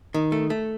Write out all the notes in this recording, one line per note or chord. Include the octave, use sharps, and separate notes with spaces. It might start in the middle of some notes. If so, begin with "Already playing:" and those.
D#3
A3
A3